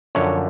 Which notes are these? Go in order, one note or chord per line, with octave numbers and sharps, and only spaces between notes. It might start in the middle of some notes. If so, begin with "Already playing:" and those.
F#2 D3 F3 C#5